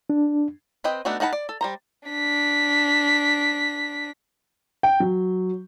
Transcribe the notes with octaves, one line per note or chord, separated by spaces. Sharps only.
D4
C4 B4 D#5 G5
A3 B3 D4 D#4 F#4
D#3 D#4 F#5 A5 B5
D5
A4
G3 C5 A#5
D4 B6
G5
F#3